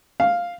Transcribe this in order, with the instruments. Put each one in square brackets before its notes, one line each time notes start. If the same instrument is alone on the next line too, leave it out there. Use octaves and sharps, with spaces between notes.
[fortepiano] F5